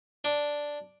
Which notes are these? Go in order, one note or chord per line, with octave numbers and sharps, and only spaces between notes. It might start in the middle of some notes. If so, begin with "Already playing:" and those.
D4